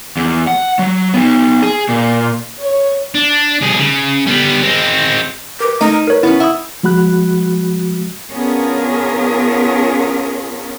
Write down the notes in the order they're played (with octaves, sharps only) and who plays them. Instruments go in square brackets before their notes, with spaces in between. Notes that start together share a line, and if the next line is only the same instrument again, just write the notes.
[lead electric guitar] E2
F#5
F#3
B3 D#4
G#4
A#2
[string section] C#5
[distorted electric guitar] D4
C2 G#4
C#3
G3 B3
G#3 C4
[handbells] A#4 B4 [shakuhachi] D6
[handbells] A3 [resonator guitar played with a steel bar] D#4 [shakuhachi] A#5
[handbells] A#4 C#5 [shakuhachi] B4
[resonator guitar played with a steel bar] B3 C#4 [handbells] E4
[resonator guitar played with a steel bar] E4 [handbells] F#5 D#6
[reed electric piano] F3 G#3 F#4 B5 F#6
[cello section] B3 C#4 D4 F4 G#4 A#4